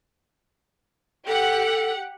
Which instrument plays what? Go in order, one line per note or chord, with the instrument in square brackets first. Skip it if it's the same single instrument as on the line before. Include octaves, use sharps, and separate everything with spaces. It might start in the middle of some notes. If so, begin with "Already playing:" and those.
[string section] G4 F#5 [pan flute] A4